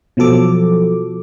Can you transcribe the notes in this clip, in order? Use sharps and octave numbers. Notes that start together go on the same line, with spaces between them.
B2 F3 F#3 A4 D6